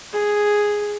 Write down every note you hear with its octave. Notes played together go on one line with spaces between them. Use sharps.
G#4